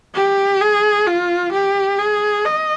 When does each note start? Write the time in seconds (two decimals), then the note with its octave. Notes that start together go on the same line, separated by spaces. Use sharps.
0.15 G4
0.61 G#4
1.07 F4
1.53 G4
1.99 G#4
2.45 D#5